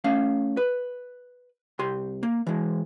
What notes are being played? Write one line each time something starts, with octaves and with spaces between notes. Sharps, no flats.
A3 C#4 F5
B4
C2 G4 C6
A#3
E3 G#3